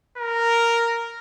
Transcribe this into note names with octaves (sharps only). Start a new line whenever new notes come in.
A#4